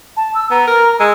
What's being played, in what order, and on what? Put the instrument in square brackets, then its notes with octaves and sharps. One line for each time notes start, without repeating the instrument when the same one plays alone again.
[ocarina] A5
E6
[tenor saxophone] B3 [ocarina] A#5
[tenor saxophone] A#4
[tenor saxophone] G#3 [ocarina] E6